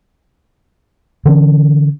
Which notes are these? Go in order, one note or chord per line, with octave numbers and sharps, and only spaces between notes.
D3 E3 C#4